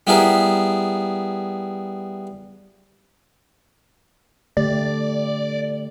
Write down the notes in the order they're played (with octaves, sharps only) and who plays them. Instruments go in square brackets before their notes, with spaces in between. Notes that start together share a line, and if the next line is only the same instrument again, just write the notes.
[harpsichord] G3 B3 E4 G#4 A#4
[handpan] D3 A3 G4 [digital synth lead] D5